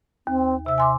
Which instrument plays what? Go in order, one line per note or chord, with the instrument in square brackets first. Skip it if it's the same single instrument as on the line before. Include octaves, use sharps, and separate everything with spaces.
[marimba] D#2 [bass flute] C4
[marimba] C3 E6 [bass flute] E5
[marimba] G#5 C6 D6